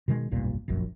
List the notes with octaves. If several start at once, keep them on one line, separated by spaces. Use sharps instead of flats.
B2 D#3 G3 G#3
F1 B1 G2 A#2
F1 A#1 F#2